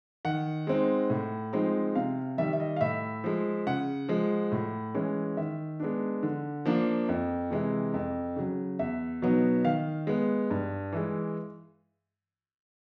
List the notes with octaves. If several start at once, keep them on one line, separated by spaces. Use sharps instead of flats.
D#3 F#5
G#3 C4 D#4
A2
F3 G#3 C4 D#4
C3 F5
D#3 G3 E5
E5
D#5
F5
A2 E5
F3 G#3
C#3 F#5
F3 G#3
A2
E3 G#3 C#4
D#3 E5
G#3 B3 D4
D3
F3 A#3 D4
F2
C3 E3 G#3
F2
C#3 F#3
E2 E5
B2 F#3 B3 D#4
D#3 F5
G#3 B3
G2
E3 G#3